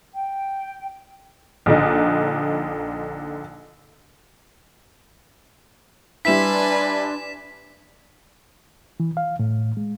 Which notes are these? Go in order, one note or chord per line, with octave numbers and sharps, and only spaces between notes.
G5
A#1 D3 D#4
G3 D4 E4 B4 G#5 C6 B6 E7
E3
F5
A2
G#3